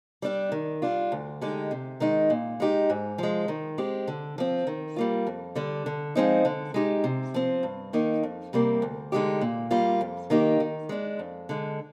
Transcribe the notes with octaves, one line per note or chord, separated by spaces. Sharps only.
G3 D4 G4
D#3
G3 D4 F4
D2
D3 G#3 D#4 G4
C3
D#3 G#3 D#4
A#2
G#3 D#4 G4
G#2
F3 G#3
D#3
G#3 C4 G4
D3
F3 C4
D#3
G3 A#3 F4
F2
D3 G3 D4
D3
F3 G#3 C4 D#4
D3
G#3 D#4 G4
C3
F3 C4
G2
D#3 A#3 D#4
F2
C3 G3 A#3
D2
D3 G#3 D#4 G4
A#2
G3 A#3 F4
F2
D#3 A#3 D#4 G4
D#3
G#3 D4
F2
D3 G#3